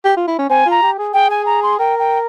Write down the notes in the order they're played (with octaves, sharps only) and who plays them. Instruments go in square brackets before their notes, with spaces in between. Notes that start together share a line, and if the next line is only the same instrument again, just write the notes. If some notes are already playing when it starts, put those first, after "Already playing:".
[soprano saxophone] G4
F4
E4
C#4
[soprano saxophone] C4 [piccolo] G#5
[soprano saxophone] F4 [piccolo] A#5
[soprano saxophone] G4
G#4
[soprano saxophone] G#4 [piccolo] G5
[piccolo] G#5
A#5
C6
[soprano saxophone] A#4 [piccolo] G5
[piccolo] G5